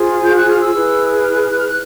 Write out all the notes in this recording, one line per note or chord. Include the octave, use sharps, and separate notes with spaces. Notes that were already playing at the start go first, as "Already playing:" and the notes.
Already playing: F4 G#4 C5
G6
F#6
F6
E6
E4 G#4 B4
F6
F#6
F6
F#6
F6
F#6